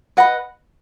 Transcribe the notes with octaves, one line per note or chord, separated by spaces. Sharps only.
B4 D#5 F#5 B5